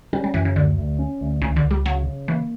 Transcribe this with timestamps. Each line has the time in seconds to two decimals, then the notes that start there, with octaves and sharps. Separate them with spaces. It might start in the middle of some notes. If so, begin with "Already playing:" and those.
0.13 G3 C#4
0.24 G3
0.34 F#2 E3
0.45 C#3
0.56 D2 D3
0.78 D2
0.99 C#4
1.21 D2
1.42 C#2 C#3
1.56 D3
1.63 C#2
1.71 G3
1.85 C#3 F#3
2.06 C#3
2.28 E3 A#3